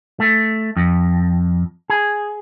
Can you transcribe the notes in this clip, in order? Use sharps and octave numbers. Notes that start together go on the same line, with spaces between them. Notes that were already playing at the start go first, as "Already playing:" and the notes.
A3
F2
G#4